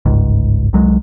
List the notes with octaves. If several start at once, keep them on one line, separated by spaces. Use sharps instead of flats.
G1 C#2 G#2
C2 F#3 G#3